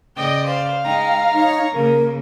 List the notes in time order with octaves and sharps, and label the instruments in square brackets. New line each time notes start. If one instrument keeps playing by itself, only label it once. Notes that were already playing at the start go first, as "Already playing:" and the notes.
[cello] C#3 D5 [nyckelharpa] D#5 G5
[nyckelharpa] C5 [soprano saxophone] F5
[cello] G#3 D#4 [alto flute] G5 [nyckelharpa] A#5
[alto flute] D#4 [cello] C#5
[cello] C#3 A#3 [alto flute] A#4